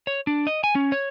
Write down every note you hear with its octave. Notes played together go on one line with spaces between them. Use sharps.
C#5
D4
D#5
G#5
C#4
C#5